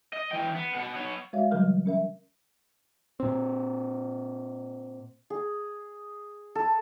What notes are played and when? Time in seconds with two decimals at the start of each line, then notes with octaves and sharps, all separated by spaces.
0.13 D#5
0.32 E3 G5
0.55 B3
0.74 B2 F#5
0.94 B3 C#5
1.33 G#3 F#4 C#5 D5 E5 F5
1.51 C#3 E3 F#3 G3 A#4 F6
1.86 C#4 A#4 E5
3.20 A#2 C4
5.30 G#4
6.55 A4